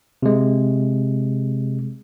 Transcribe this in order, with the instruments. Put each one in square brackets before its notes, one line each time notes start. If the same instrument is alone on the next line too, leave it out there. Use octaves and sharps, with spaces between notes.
[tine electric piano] C3 G#3